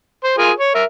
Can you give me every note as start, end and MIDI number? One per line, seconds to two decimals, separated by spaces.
0.24 0.36 72
0.38 0.51 65
0.38 0.51 68
0.38 0.51 70
0.57 0.73 73
0.74 0.84 70
0.74 0.84 76